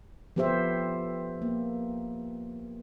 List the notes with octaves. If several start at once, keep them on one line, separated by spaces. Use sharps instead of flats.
F3 B3 G4 A4 C5 E5
A#3